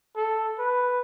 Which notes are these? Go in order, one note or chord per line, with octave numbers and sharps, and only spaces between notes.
A4
B4